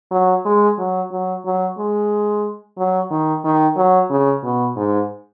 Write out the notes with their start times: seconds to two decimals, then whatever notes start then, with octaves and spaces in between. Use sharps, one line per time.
0.11 F#3
0.45 G#3
0.78 F#3
1.11 F#3
1.45 F#3
1.78 G#3
2.78 F#3
3.11 D#3
3.44 D#3
3.77 F#3
4.10 C#3
4.44 B2
4.76 G#2